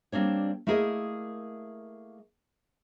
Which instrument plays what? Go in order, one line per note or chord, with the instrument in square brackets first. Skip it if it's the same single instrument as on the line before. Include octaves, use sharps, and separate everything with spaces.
[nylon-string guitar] G3 A#3 C4 D4 C#5
A3 A#3 E4 G#4 A#4 D#5